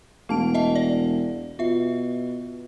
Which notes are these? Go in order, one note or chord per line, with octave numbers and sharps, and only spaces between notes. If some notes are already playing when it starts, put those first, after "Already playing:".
E1 A3 A5 D7
D#5 E5 A5
D5
B2 F4 E5